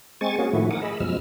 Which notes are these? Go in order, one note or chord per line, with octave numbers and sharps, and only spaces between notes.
G#3 C4 G#5 C#6 A6
A#3 C#4 F#4 G#4
A2 D#3 F3 A3 E4 F#4
A#4 F#5 G#5 D6 D#6
G#4 D#5 B5 E6
F#2 B2 F3 G#3 E6 F6